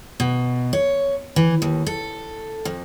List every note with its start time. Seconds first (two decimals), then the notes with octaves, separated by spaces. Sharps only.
0.20 B2
0.73 C#5
1.36 E3
1.62 D#2
1.87 A4
2.65 F2